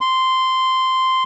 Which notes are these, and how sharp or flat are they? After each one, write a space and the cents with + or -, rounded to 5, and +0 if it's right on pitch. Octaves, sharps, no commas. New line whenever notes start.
C6 -10